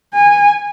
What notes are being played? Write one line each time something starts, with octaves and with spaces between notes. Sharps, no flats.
G#5